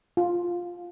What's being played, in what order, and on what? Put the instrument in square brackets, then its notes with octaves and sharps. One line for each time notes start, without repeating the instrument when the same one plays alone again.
[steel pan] F4